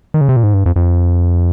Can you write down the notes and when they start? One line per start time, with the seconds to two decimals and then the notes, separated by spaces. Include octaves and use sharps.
0.14 D#3
0.21 C#3
0.29 C3
0.36 A#2
0.43 G#2
0.54 G2
0.66 F2
0.76 F2